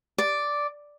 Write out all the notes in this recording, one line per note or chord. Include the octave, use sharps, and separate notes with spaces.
D5